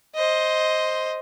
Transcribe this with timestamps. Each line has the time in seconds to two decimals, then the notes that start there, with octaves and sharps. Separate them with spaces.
0.15 C5 D#5